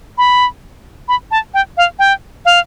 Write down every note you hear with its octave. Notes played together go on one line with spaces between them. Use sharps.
B5
B5
A5
G5
F5
G5
F5